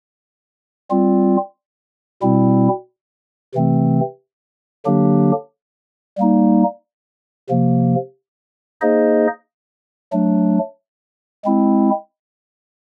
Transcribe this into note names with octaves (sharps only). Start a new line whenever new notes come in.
G3 C4 F4
B2 G3 C4 E4
C3 E3 A3 C4
D3 F#3 A#3 D4 G4
G3 A#3 D#4
C3 F3 A#3
A#3 D#4 G#4 C5 D#5
F#3 A3 D4
G#3 C4 E4